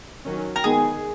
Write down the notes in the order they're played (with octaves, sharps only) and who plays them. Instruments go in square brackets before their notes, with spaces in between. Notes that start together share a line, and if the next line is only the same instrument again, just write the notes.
[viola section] D#3 F#3 C#4
[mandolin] A#4
[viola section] D#3 G#3 B3 [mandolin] G#4